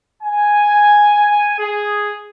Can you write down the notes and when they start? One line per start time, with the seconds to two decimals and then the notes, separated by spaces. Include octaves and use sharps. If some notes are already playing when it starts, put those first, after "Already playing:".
0.23 G#5
1.59 G#4